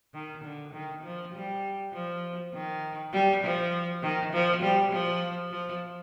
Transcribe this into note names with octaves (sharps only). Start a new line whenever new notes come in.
D#3
D3
D#3
F3
G3
F3
D#3
G3
F3
D#3
F3
G3
F3
F3